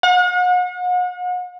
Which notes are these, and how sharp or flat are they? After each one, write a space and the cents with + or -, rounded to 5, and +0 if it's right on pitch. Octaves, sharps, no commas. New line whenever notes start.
F#5 -40